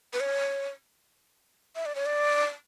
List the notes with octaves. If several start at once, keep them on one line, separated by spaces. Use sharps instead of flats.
B4
C#5
E5
D5
C#5
D5